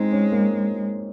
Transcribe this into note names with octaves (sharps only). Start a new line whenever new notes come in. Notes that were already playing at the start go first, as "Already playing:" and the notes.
Already playing: G#3 C4 D#4
C#4
A#3